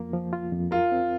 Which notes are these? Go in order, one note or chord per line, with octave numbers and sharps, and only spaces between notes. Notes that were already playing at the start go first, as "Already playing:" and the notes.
Already playing: F2 F3 A#3 F4
F3
F4
F2
F4 A#4
C4